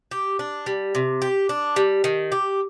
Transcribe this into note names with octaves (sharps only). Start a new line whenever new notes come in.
G4
D4
G3
C3
G4
D4
G3
D#3
G4